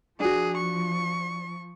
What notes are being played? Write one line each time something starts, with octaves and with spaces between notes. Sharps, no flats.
F3 D4 F#4 G#4
C#6